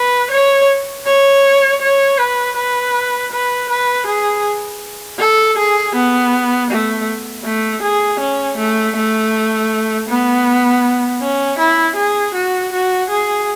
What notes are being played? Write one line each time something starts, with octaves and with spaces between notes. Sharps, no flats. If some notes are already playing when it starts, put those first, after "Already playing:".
Already playing: B4
C#5
C#5
C#5
B4
B4
B4
B4
G#4
A4
G#4
B3
A3
A3
G#4
C#4
A3
A3
B3
C#4
E4
G#4
F#4
F#4
G#4